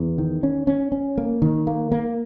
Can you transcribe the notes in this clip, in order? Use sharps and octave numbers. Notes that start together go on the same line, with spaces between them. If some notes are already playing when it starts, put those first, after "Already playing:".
Already playing: E2
D#3
C#4
C#4
C#4
A#3
D#3
A#3
A#3